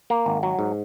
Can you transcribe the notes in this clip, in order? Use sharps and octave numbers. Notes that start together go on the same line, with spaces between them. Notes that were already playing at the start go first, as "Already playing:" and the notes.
A#3
G#1
F#3
G#2